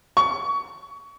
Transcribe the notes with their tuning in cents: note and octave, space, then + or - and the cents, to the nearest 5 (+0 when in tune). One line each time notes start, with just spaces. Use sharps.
C#6 +25